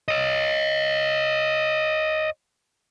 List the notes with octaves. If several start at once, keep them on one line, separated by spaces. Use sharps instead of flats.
C#5 D#5